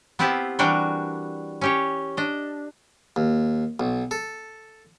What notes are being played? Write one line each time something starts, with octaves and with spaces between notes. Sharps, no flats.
B3 C4 E4 F4 G4 A5
E3 G3 D4 F#4 A#4 G5
C#4 G4 C#5
D4 D#5
D#2
B1
A4